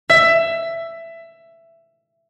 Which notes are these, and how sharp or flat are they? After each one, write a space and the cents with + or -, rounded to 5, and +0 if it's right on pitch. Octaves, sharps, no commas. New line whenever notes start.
E5 +15